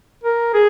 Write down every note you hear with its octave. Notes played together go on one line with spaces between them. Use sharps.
A#4
G#4